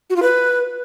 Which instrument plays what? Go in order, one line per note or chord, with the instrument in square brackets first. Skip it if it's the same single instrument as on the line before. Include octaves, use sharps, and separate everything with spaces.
[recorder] F#4
F4
B4